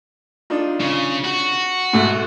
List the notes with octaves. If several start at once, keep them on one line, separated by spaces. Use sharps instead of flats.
D4 D#4 F4
C#3
F#4
G#2 B2 A3